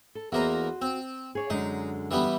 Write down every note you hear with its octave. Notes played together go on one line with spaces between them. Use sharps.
A4
E2 A#3 F#4 C5 D#5 A#5
C4
G#4 C#5 D5
F#2 D3 G#3 D#4
E3 G3 B3